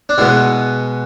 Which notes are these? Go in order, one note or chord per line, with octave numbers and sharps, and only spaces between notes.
D4
B2 G#3 B3 E4